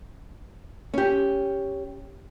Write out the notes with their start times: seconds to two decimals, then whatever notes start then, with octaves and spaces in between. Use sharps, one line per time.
0.94 C#4 G4